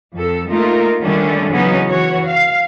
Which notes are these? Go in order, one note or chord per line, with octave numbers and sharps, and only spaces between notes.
F2 A4
A3 A#3 D#4 F4 A#4
D3 D#3 G3 A3 C#4 D4
C#3 E3 F#3 B3 C#4 D#4
E3 F#4 C#5
F5